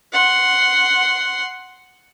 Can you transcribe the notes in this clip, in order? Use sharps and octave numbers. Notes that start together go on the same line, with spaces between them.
F#5 C6